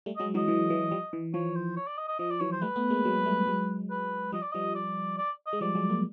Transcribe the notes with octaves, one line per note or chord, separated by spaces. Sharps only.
G3 A3
F#3 G#3 D#5
E3 F#3 D#5
E3
E3
F3 G3
E3
F3 C#5
C5
C#5
D5
D#5
D#5
F3 D#5
D5
E3 F#3 C#5
C5
G3 A3 B4
A3 B3
G#3 A#3
F#3 G#3
G3 A3
F#3 G#3
B4
F3 G3 D#5
D5
F3 G3 D#5
D5
D5
D#5
G#3
F3 G3 D5
F#3 G#3
G#3 A#3